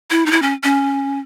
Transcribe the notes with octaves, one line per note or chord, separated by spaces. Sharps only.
E4
D#4
E4
C#4
C#4